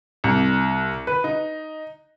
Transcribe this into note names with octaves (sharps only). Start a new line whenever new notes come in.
C2
B4
D#4